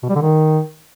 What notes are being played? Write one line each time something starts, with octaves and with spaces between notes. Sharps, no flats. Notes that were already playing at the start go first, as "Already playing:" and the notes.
B2
G3
D3
D#3